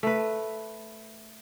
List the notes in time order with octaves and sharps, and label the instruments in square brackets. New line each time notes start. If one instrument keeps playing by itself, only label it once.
[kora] A3 B4